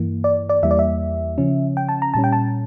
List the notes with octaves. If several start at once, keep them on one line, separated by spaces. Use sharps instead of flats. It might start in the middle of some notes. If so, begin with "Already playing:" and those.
Already playing: G2 E3 A#3
D5
D5
E2 E3 G3 A#3 E5
D5
E5
C#3 F3 C#4
G5
A5
A#5
A#2 G3 C#4 A5
G5
A5